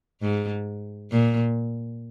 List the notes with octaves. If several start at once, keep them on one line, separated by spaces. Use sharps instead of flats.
G#2
A#2